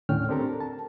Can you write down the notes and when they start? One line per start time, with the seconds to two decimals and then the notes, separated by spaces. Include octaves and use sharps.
0.09 D#2 A2 D3 C#4 G5 F6
0.29 C4 D4 G4 A4 A#4 A#5
0.60 A5